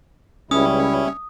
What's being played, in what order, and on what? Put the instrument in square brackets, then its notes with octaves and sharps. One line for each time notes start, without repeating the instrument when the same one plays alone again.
[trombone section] C#2 [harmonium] G3 E4 [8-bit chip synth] C#4 [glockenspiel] D#6